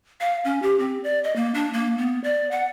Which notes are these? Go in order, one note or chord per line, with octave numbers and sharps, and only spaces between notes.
F5
C#4
G4
C4
D5
D#5
A#3
D4
A#3
B3
D5
F#5